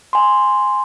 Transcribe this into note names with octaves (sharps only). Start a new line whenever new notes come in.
G#5 C6